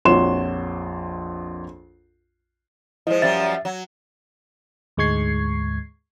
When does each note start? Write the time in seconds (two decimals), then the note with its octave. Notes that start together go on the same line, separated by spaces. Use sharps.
0.05 A#1 F2 F#4 C#5 C6 E7
3.07 F3 G#3 E4 C5 D#5
3.22 F#2 F3 G3 E5 A6
3.65 F#3
4.97 D2 G#2 G#3 C#6 G#6 C7